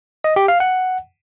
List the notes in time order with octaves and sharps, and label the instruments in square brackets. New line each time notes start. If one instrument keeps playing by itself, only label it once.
[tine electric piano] D#5
G4
F5
F#5